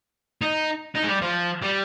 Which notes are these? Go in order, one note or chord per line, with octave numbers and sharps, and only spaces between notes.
D#4
D#4
G#3
G3
F3
G3